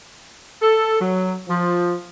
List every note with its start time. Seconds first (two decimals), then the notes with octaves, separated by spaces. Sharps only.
0.62 A4
1.01 F#3
1.48 F3